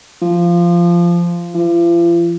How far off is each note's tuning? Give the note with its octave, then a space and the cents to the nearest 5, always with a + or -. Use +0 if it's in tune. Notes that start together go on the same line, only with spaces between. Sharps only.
F3 -15
F3 -45